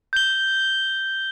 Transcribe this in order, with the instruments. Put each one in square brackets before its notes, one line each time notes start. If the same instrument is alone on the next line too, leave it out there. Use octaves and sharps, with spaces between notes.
[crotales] G6 G7